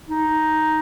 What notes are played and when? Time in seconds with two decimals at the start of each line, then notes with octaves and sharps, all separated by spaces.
0.09 D#4